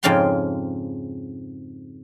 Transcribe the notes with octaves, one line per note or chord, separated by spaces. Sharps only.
F2 G#2 C#3 F5 G5 C6